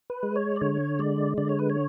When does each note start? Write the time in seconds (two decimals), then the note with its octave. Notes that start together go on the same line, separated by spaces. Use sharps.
0.10 B4
0.23 G#3
0.36 C#5
0.56 D5
0.61 D3 C#5
0.99 G#3 D5
1.38 D3 D5
1.49 C#5
1.59 B4
1.70 C#5